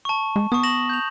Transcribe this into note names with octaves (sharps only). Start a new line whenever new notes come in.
A5 C#6
G#3
B3 C#6 D#6
A#6 E7 F#7
G6 F7